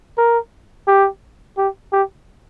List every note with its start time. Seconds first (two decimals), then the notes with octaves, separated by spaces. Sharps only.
0.18 A#4
0.88 G4
1.58 G4
1.92 G4